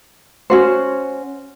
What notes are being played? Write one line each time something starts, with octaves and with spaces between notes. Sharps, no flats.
C#4 F#4 C5